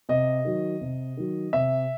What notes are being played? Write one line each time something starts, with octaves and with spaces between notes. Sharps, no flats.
C3 D#5
D#3 F#3
C3
D#3 F#3
C3 E5